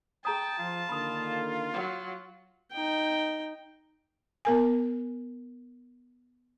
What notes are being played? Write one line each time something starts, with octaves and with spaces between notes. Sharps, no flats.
G#4 G5 A5 A#5 D#6
F3 F4
D3 D#3 A#3 B5 D#6
F#3
D#4 G5
B3 A#4 G#5